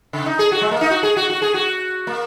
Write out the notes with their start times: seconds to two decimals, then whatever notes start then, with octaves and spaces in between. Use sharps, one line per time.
0.13 C#3
0.26 D#4
0.39 G#4
0.52 F#4
0.61 G#3
0.71 A#3
0.81 D#4
0.91 F#4
1.03 G#4
1.17 F#4
1.30 F#4
1.42 G#4
1.54 F#4
2.07 A#3